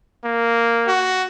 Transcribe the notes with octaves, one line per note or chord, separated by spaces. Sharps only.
A#3
F#4